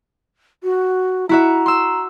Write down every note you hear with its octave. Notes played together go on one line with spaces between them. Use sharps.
F#4
E4 F#4 E5 A#5
C6 E6